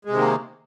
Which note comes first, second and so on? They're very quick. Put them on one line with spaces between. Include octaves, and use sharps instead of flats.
G#3 C3 D#3 A#3